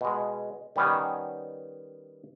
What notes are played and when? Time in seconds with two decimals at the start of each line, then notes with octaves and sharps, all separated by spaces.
0.01 B2 G#3
0.76 D#3 G3 B3 C#4 D#4